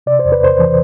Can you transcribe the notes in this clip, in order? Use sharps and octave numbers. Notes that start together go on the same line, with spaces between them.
C3 D5
C5
E2
B4
E2 C5
E3